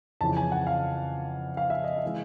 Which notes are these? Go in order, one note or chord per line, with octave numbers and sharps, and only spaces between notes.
F2 C#3 E3 A5
G#5
F#5
F5
F5
E5
D#5
E5
E3 G#3